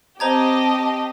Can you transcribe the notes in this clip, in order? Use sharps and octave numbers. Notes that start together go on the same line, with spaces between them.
C4 G4 C5 D#5 A5 A#5 G#6